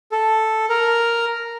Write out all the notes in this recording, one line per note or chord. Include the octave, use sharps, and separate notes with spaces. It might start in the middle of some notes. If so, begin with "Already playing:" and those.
A4
A#4